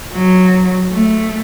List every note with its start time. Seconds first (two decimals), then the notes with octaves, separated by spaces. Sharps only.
0.14 F#3
0.91 A3